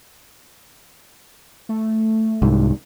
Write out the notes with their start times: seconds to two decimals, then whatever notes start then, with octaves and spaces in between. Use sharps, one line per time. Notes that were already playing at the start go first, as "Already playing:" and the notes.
1.69 A3
2.42 C2 G#2